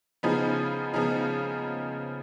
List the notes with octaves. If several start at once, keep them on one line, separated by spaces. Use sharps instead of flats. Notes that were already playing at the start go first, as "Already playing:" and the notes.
C#3 F3 B3 D#4 G#4
C#3 F3 B3 D#4 G#4